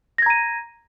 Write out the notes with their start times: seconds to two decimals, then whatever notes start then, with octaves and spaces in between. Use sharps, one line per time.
0.18 A#6
0.22 G#6
0.26 A#5
0.30 D#7